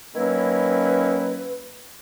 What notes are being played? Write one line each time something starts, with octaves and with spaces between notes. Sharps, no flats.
D#3 F#3 A#3 C#4 E4 B4